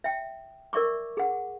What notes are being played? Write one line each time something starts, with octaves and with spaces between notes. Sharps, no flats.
E5 G5
A#4 D5 E5 C#6 D6
G#4 F#5